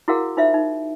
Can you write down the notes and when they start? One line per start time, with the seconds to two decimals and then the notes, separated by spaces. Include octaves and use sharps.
0.08 E4 F#4 G#4 A#4 F5 F#5
0.37 D#4 F4 C5 E5 F5
0.54 D#4